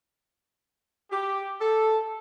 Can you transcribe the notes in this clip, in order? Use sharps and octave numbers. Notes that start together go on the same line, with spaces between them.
G4
A4